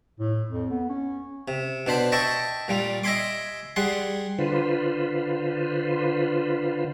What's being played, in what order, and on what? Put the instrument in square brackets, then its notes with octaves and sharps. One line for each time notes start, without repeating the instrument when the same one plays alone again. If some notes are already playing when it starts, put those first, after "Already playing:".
[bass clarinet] A2
F2
B3
C#4
[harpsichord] C3
B2 D4 C5 B5
D#5 E5 G5 A5 C#6
A#2 G3 F4
D#5 E5 G#5 B5 C6 D6
G3 G#4 F#5 C6
[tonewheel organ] D3 F4 B4 C5